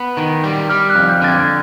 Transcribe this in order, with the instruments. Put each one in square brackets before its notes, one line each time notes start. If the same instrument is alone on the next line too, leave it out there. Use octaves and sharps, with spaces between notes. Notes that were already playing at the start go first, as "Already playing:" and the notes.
Already playing: [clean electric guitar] B3
D#3
G3
[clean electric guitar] G3 [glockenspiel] F6
[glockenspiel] F#6
[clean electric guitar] F2
[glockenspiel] G6
[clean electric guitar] D3 [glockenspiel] A6
[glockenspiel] G#6